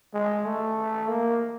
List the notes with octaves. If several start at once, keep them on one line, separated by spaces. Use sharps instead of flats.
G#3
A3
A#3